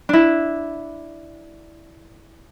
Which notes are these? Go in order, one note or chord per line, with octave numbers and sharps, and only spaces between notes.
D4 E4